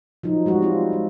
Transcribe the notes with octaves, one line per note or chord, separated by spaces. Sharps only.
F3 F#3 D#4
G3 G#3 F#4
C4 F4
G#3